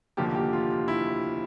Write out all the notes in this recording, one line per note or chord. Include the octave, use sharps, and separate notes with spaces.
F1 D#2 D3 F3 A#3 G4
G4
F4
E4